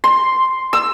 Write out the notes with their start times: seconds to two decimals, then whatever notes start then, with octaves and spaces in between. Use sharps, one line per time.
0.04 C6
0.73 E6